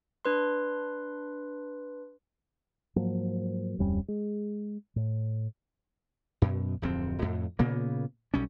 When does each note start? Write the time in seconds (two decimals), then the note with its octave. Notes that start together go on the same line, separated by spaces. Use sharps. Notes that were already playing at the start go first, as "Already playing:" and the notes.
0.25 D4 B4 C6
2.96 G#2 F3 F#3 A#3
3.79 D1 F2 G3 C#4
4.08 G#3
4.96 A2
6.42 F#2 B2
6.82 D1 F2 C4
7.22 F2 A2
7.59 A#2 C#3 A#3 B3
8.34 B1 G3 C#4